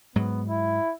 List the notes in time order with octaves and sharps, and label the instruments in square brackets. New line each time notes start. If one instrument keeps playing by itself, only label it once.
[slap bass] G#2 F#3 [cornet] B3
[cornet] E4